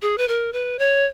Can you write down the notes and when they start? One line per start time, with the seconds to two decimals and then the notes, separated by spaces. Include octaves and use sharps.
0.02 G#4
0.18 B4
0.28 A#4
0.53 B4
0.79 C#5